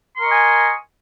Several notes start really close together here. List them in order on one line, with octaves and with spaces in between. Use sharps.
C6 A#4 C#6 D#5 G#5